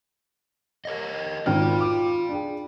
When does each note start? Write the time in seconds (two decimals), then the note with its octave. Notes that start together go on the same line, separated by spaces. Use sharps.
0.85 A#4 C#5 D#5
1.46 G#1 F4 F#4 D5 G5 F6
1.81 D6
2.29 D4 G#4